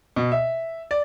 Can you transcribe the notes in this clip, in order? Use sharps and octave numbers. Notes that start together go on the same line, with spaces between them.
B2
E5
D5